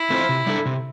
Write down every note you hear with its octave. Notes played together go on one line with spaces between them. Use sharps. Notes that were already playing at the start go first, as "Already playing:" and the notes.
Already playing: E4
A3 C4 F4 C5
C3
G3 D4 A4
C3